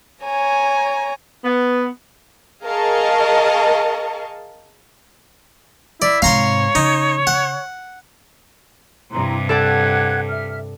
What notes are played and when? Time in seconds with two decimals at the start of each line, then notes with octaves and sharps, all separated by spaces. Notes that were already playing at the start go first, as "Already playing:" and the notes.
0.25 C#5 G#5 A#5
1.44 B3
2.65 G#4 A#4 D#5 F5 A5 C#6
6.02 E4 D5
6.22 G#2 C3 C#5 F5 A#5 C6
6.75 C#3 D#4
7.27 F#5
9.11 G2 C3 E4 A#5 C6
9.49 A4 D5 F#5 A5 F#6 G#6
10.28 E5 F6